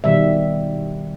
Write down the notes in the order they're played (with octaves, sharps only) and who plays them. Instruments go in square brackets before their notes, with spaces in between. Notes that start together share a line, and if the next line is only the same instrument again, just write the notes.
[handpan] B2 D#3 G3 E5